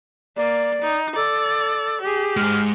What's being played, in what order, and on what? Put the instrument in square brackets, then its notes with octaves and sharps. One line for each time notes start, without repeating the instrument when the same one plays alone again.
[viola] A#3 [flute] D5
[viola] D#4
[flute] A4 [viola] D5
[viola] G4 G#4
[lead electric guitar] G#2 G#3 [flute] F6